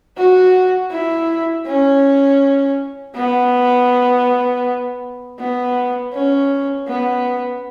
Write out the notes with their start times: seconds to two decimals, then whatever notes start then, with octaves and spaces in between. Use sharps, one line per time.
0.17 F#4
0.91 E4
1.66 C#4
3.15 B3
5.39 B3
6.13 C#4
6.88 B3